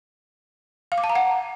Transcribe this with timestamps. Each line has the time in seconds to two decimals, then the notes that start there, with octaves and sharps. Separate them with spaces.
0.92 F5
0.98 D6
1.04 A5
1.09 A#5
1.15 F#5